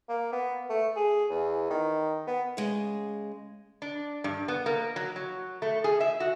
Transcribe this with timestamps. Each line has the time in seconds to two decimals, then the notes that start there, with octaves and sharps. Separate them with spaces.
0.09 A#3
0.32 B3
0.69 A3
0.96 G#4
1.29 E2
1.70 D#3
2.27 B3
2.57 C#3 G#3
3.82 D4
4.24 G2
4.48 B3
4.66 A#3
4.96 F#3
5.16 F#3
5.62 A3
5.84 G#4
6.00 E5
6.20 F#4